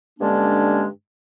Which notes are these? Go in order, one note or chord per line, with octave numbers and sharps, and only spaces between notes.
G2 D3 G#3 A#3 C#4 D4